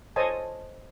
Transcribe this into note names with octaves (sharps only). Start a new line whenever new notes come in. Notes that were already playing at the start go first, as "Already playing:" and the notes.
A4 C5 C#5 D#5 G#5 A5